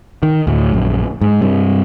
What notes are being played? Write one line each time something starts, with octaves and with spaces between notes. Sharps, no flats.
D#3
D2 A2
A#1 F#2
G#2
G2 C3